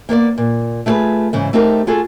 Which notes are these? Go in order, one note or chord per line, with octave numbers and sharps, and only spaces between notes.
A#3 B3 C5 D5
A#2
A3 E4 F4 G#4 B4
G#2 C#3 E3
A3 C4 D#4 G4 A#4
F4 F#4 G#4 A4